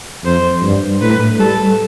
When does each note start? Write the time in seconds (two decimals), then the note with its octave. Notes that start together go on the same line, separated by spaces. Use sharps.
0.24 F2 C5
0.63 G2
1.01 A2 B4
1.39 G3 A4